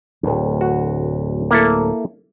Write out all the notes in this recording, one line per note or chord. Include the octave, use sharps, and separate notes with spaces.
D1 D2
F#4
A#3 E4 A4